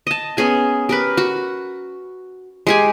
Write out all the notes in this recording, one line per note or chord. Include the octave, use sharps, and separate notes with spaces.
D#5 A5
B3 C#4 G#4 G#5
G4 A#4 B4
F#4
G#3 G4 G#5